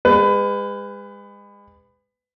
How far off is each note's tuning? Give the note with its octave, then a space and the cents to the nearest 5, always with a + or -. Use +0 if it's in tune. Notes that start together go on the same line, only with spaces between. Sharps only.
G#3 -35 B4 +25